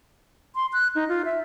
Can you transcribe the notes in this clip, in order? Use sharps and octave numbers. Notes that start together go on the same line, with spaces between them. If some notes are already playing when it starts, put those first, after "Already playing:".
C6
F#6
D#4
F4
E5